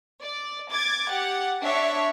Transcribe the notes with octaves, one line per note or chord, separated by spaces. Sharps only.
D5
D6 G#6 A6
G4 F#5
D4 C#5 E5 C#6